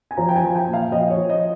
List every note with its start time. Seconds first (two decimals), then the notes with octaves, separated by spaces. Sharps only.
0.11 G#5
0.17 F3 A#5
0.29 G5
0.36 G#5
0.43 F3
0.55 G5
0.68 A#2
0.73 F5
0.92 F3 D#5
1.10 C#5
1.17 F3
1.30 D#5